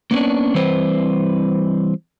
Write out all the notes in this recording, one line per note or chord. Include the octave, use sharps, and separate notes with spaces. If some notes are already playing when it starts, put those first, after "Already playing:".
A#3 B3 C#4 D4
E3 G3 C4 B4 C5